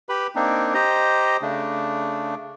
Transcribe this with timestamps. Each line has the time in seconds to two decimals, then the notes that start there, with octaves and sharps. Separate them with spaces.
0.09 G4 B4 B5
0.36 A#3 C4 D4 D#4
0.74 G4 C5 D#5 A#5
1.42 C#3 A3 D4